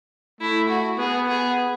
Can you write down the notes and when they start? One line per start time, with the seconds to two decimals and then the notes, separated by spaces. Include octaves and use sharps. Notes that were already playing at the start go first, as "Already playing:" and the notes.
0.41 A3 E4
0.69 F#4
0.99 B3 G#4
1.28 G#4